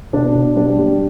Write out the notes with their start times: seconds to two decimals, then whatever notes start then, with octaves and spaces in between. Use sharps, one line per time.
0.13 B2 D4
0.35 B2
0.56 G3 D4
0.78 G3